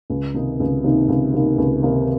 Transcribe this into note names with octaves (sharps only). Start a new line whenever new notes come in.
C#2
C3 D#3 A#3 D#4
C#2
C3 D#3 A#3 D#4
C#2
C3 D#3 A#3 D#4
C#2
C3 D#3 A#3 D#4